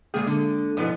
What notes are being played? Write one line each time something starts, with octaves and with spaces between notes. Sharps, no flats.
A#2 F3 G#3 A#3 G#4
D3
G#2 B2 F3 B3 E4 D#5